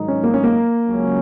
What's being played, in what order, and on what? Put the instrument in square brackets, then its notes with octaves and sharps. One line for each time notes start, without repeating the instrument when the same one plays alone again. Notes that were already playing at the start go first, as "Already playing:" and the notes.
Already playing: [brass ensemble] G#2 D#3 F#3 D#4
[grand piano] C#4
A#3
C#4
A#3
[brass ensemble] C#2 C#3 F#3 C#4